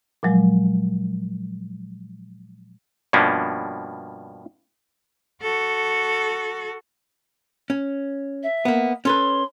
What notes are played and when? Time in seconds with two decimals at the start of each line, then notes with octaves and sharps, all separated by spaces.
0.23 A#2 F3 F#3 G#3
3.13 G2 B2 F3 A#3 C#4 D4
5.42 F#4 A4
7.70 C#4
8.43 E5
8.65 A#3 B3
9.05 C#4 A4 B4 C6